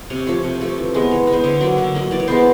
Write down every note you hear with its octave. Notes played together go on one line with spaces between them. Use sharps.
C3 C#5
F3 A3 C#5
C3
F3 A3
E3
G#3 B3
E3 C#5
G#3
B3 C5
D3 C#5
F#3 A#3 D5
D3 E5
F#3 A#3 D#5
E3 D5
C#5
G#3 B3 C5
D5